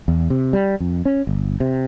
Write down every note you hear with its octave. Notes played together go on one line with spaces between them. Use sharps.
E2
C3
G3
F2
C#4
G1
C3